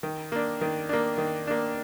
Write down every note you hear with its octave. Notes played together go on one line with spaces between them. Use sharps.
D#3
A#3 D4
D#3
A#3 D4
D#3
A#3 D4